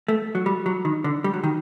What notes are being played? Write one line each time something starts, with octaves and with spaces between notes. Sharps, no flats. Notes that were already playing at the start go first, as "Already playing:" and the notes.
A3
F#3
G3
F#3
D#3
D3
G3
F#3
D#3